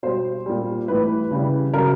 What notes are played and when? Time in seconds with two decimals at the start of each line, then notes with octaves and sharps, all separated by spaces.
0.03 B2 G3 C5
0.46 A#2 G3
0.88 A2 E3 G3 B4
1.31 C#3 E3 G3
1.74 C#3 F#3 A#4